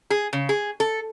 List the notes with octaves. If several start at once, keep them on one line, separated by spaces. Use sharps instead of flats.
G#4
C#3
G#4
A4